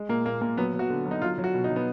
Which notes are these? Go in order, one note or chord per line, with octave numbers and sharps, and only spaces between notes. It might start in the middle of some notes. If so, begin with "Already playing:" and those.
Already playing: G#3
A#2 A#3
A#2 A#3
A#2 A#3
F#3 B3
F#3
F#4
D3
F#3
D#4
F#3 F4
F#3
F#4
B2
D#4
F#3
B3